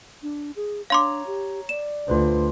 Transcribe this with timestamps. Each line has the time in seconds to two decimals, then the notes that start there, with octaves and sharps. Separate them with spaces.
0.23 D4
0.56 G#4
0.90 D4 C#5 F5 A#5 C6 D6
1.26 G4
1.69 D5 E7
2.08 D2 F4 B4 C5